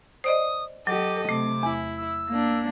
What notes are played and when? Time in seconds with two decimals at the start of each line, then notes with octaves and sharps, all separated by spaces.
0.24 C5 D5 D#5 D#6
0.87 F#3 G4 A4 D#5 D6
1.29 C3 A3 D6
1.63 E2 E4
1.97 E6
2.29 A#3 D4